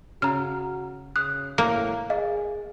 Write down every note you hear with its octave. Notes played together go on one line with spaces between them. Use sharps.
C#3 F#4 A#5 F6
C#3 D#6 F#6
A2 A#3
G#4 D#5 F5